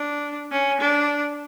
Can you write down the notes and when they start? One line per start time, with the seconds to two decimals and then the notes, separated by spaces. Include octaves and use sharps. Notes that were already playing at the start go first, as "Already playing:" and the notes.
Already playing: D4
0.52 C#4
0.80 D4